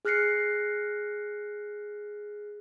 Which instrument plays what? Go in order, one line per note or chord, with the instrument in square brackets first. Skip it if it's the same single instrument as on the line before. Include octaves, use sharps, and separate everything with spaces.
[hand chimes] G#4 F6 F#6 A#6 C7 C#7